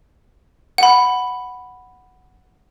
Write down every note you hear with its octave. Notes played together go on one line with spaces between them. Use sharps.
F#5 B5